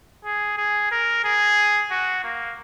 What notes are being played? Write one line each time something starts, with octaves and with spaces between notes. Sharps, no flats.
G#4
G#4
A#4
G#4
F#4
A#3